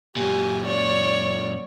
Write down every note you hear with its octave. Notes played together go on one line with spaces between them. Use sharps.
F#2 A#2 G4 G#5
C#5 D5